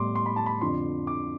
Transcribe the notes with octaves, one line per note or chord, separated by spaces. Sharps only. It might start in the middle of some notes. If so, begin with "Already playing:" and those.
Already playing: A2 G3 B3 C6 D6
C6
B5
A5
B5
F2 D3 F3 C6
D6